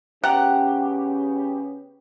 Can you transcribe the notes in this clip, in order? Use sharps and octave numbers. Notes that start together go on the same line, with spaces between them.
C#3 B3 C#4 G4 F#5 G5 A#5